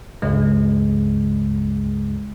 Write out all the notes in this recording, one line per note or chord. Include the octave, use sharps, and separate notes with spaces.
C#2 G2 C#3 G#3